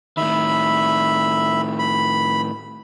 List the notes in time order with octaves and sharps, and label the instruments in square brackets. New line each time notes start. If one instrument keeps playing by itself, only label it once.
[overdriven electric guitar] A2 D#3 [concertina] E5 B5
[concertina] B5